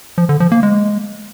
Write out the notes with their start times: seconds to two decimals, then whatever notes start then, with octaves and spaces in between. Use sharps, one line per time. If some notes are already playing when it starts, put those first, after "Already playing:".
0.18 F3
0.29 D3
0.40 F3
0.52 A#3
0.63 G#3